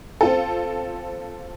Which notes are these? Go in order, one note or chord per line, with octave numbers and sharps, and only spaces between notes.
C4 F4 A4